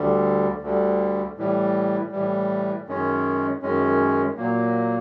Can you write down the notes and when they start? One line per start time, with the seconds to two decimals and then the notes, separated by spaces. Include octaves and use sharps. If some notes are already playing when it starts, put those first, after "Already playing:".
Already playing: D2 D3 G3
0.62 D2 D3 G3
1.37 A2 E3 G3
2.12 A2 E3 G3
2.88 F#2 D#3 G#3 C#4
3.62 F#2 D#3 G#3 C#4
4.37 A#2 F#3 A#3